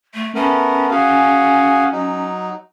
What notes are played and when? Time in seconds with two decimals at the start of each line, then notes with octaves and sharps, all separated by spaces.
0.14 A3
0.35 A3 B3 C#4 A#4
0.91 F#4 G#4 F5
1.93 F#3 D#4